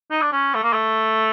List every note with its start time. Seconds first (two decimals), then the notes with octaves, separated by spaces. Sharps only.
0.11 D#4
0.21 D4
0.32 C#4
0.54 A3
0.63 A#3
0.73 A3